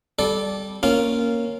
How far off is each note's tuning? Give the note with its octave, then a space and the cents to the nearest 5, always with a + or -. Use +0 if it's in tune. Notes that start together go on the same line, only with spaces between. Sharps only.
G3 +0 A4 -15 D5 -5
A#3 +0 C#4 +0 F4 -10